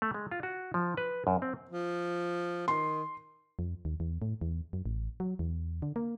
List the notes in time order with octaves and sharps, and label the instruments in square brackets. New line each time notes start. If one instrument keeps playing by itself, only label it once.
[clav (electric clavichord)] A3
G#3
F4
F#4
F3
B4
F#2
C4
[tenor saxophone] F3
[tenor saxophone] D#3 [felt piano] C6
[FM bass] F2
D#2
E2
A2
E2
F#2
A1
F#3
E2
D3
A#3